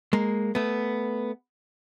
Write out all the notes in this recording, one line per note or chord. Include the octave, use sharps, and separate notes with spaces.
G#3 A#3
A3 B3